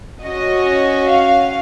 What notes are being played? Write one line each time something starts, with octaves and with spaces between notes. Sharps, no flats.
C#4 F#4 D#5
F5